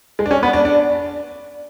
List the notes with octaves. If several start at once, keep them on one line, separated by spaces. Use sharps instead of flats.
G#3
D4
C#4
B3
D4
D4